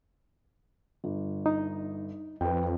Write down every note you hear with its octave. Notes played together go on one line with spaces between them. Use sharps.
G1
D#4
F2 B4 G5